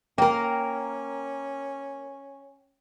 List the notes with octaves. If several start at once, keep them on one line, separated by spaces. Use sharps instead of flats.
A#3 C#4 A#4 G5